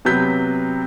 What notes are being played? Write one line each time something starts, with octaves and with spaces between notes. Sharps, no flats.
C3 F#3 B3 G6 B6